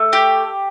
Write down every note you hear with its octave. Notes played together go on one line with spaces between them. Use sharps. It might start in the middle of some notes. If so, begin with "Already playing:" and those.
Already playing: A3
G4